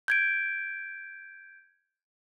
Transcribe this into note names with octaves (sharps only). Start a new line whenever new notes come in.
G6 G#6 D7